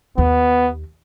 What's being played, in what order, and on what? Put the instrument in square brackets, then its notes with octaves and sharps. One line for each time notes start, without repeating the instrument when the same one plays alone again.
[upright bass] D#2 [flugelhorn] B3